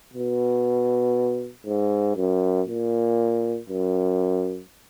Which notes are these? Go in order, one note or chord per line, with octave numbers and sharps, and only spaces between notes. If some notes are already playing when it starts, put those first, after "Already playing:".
B2
G#2
F#2
A#2
F#2